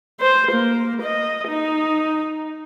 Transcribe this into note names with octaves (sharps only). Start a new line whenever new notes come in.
C5
A#3
D#5
D#4